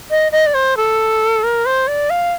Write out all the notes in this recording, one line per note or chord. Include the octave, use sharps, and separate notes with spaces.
D#5
D#5
D5
C5
A4
A#4
C5
D5
F5